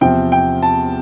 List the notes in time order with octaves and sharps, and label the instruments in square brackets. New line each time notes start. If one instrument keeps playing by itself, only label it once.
[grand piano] E2 C3 F3 G5
G5
A5